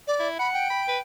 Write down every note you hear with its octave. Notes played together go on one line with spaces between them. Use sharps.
D5
E4
F#5 B5
G5
B5
B4